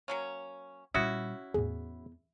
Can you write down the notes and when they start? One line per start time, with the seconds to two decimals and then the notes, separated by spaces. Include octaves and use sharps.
0.08 F#3 A#3 C#4
0.94 A#2 G3 C#4 E4 F#4 D#6
1.54 E2 A2 G#4